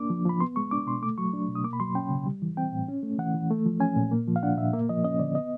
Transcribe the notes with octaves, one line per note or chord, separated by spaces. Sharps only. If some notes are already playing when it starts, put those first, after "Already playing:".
Already playing: A#3 D4 D6
F3
F3 B5
B3 C6
G#3 C#6
D4 D6
B2 C6
A3 D6
F#3 C#6
D4
B2
D#6
A#3 D6
B5
F#3 C6
C#4 G5
C#3
G3
E3
C4 G5
A2
C#4
A3
E3 F#5
E3
A3
F3
C#4 G#5
A#2
A#3
F3
F5
D4 F#5
A#2 E5
A#3 E5
F3 D#5
C#4 D#5
D3 D5
B3 D#5